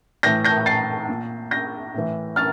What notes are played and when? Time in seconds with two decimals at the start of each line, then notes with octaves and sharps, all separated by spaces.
0.23 A2 E3 G6 A#6
0.44 G6 A#6
0.66 A6 C7
1.09 A#2
1.51 G6 A#6
1.94 A2 E3
2.36 F6 A6